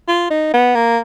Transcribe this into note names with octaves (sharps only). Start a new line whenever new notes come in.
F4
D#4
B3
A#3